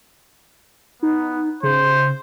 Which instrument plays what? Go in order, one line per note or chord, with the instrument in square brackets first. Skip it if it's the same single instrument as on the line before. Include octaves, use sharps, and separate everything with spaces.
[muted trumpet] B3 [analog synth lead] D#4
[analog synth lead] C#3 [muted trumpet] C5